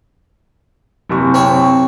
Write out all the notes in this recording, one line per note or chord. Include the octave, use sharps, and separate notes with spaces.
F#1 C3 C#6
C4 C#5